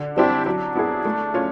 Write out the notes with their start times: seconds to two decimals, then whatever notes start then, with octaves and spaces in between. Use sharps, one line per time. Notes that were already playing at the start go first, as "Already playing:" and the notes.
Already playing: D3
0.17 G3 C4 D4 E4 G4
0.46 F#3 D4
0.75 B3 E4 G#4
1.05 A3
1.34 C#4 F4